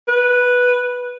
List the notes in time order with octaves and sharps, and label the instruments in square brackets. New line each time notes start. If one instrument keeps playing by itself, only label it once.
[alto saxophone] B4